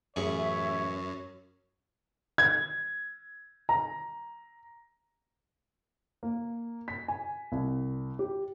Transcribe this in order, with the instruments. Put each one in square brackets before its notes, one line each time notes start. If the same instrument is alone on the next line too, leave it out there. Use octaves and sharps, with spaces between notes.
[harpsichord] A1 G#4 C#6 [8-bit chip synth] F#2 [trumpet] C#5 [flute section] E5
[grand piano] G#6
A#5
[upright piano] A#3
B6
G#5
C2
G4